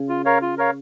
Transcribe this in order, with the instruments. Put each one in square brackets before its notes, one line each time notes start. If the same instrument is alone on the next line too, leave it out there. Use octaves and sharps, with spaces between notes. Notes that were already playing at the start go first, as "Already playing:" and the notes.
Already playing: [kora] C#3
[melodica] F4
A#4 C#5 F5
F4
A#4 C#5 F5